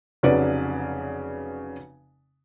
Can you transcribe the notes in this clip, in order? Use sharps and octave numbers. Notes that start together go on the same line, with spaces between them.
F1 C#3 F#3 B4 D5